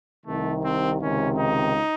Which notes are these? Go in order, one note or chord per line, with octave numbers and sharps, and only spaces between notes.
C2 C3 D#3 A3
C4
C#2 C3 D#3 C#4
D#4